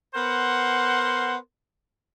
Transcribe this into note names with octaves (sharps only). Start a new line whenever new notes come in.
B3 A#4 C5 F#5 C6